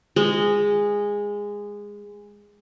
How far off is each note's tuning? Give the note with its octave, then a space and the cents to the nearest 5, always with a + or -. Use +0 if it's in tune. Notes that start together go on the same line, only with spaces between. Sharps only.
G#3 -15